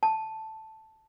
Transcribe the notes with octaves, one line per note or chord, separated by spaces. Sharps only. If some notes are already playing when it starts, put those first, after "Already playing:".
A5